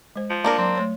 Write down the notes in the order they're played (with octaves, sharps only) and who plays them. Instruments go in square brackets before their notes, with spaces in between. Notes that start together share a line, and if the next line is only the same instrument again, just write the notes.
[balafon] G#3 C5
[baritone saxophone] F3
[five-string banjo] A#3 D4 A#4
[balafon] F#3 D5 [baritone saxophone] C4
[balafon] A3 C#5 C6